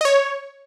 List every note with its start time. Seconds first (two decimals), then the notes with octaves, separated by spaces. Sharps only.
0.01 D#5
0.05 C#5